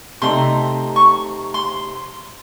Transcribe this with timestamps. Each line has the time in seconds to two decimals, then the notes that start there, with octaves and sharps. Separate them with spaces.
0.22 C3 A3 D#4 C6
0.96 C#6
1.54 C6